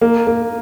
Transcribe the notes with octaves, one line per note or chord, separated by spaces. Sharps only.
A#3
A#3